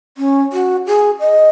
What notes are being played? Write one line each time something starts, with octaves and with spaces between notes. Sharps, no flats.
C#4
F#4
G#4
D#5